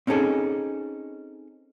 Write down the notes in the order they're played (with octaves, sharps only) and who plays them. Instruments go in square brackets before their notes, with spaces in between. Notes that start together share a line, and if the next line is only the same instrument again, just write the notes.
[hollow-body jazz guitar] C4 C#4 D#4 G#4 A4